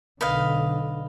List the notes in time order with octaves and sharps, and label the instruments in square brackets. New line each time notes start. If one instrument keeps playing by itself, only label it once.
[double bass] B1 D3 [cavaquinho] B4 D#5 F5